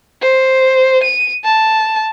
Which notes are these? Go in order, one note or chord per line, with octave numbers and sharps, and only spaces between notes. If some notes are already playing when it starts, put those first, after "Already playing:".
C5
D#7
A5